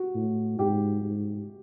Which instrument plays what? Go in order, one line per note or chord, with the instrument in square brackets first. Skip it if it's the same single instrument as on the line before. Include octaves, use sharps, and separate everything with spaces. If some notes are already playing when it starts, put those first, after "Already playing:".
Already playing: [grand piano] F#4
[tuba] A2
[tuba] G#2 [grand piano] G4
[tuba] G#2